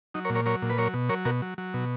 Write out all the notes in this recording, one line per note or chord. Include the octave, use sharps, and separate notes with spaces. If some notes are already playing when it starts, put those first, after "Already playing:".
F#3 D#4
A#4 C#5
A#2
A#4 C#5
F#3 A#4 C#5
A#2
B4
F#3 A#4 C#5
B2
F#3 A#4 C#5
B2 F#4 A#4
F#3
F#3
B2